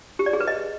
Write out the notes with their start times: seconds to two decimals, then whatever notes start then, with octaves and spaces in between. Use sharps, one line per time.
0.19 G4
0.26 D5
0.33 G#4
0.40 B4
0.48 D#5